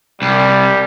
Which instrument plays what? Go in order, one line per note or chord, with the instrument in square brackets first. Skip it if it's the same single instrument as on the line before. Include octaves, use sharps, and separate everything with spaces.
[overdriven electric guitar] C2 [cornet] G3